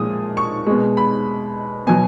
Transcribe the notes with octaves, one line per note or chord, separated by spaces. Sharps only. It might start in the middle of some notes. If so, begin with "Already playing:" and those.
Already playing: A#2 F3 G#3 D#6
C#6
B2 G#3
B5
B2 F#3 G#5